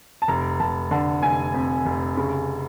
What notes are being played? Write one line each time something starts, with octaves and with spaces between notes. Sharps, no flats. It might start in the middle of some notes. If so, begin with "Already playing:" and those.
A5
F1 A#5
F1 A5
D3 A5
F1 G#5
F2
F1
C#3